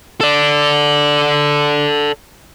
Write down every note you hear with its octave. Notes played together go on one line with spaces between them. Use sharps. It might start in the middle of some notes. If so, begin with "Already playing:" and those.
A4 D5